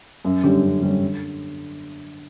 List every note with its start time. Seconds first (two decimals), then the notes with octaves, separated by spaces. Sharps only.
0.25 F#2
0.44 D3 G3 C#4 G4
0.63 F#2
0.82 D3 G3 C#4 G4
1.02 D3